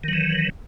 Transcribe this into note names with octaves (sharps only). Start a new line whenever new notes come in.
D#3 E3 F#3